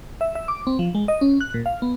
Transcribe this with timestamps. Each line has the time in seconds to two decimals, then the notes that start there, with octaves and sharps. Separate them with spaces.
0.21 E5
0.35 E5
0.48 D6
0.67 C4
0.79 F3
0.95 G#3
1.08 D#5
1.21 C#4
1.41 F#6
1.54 A#2
1.66 F5
1.82 B3